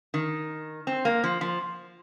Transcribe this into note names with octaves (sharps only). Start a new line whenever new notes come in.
D#3
C4
A#3
F3
F3